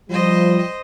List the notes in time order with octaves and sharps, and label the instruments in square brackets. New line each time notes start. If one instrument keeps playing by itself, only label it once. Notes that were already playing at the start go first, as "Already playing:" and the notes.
[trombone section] F3 G3 [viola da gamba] C5 D#5